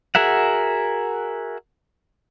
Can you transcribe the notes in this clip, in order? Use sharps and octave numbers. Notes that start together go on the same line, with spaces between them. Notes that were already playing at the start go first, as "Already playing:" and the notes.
F#4 G#4 A#4 E5 F#5